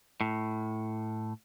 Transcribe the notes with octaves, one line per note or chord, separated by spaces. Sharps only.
A2